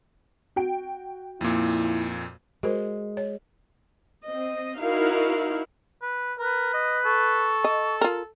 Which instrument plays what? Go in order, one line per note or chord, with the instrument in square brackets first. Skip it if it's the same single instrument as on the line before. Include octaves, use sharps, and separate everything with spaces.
[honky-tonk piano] F#4 G5 D7
[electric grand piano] F2 A#2 [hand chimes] A#3 D#4 [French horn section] E4
[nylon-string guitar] G#3 [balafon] F#4 A#4 C5
[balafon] C#5
[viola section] C4 D#5
D#4 E4 F#4 A#4 F5
[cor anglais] B4
[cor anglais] A#4 [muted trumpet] B4
[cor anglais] D#5
[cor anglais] A4 [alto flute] C#6
[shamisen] D#5
F4 A#4